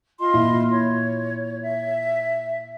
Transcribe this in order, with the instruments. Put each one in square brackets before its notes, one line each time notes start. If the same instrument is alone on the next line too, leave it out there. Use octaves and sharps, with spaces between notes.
[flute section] F4 D#5 C6
[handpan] A#2 E4
[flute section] C#5
E5